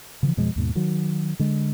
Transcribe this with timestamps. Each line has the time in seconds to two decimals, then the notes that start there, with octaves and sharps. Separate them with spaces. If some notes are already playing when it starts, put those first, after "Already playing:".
0.23 C#3 E3 F3
0.37 F2 B2 F3 G#3
0.56 D#2 G#2 B2
0.75 D#3 F#3
1.39 D3 G#3